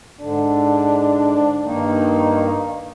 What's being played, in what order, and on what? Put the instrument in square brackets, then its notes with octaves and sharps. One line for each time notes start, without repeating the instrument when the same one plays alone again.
[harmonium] G#2 D3 [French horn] D4
[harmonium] G2 A#3 D#4 [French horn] D#3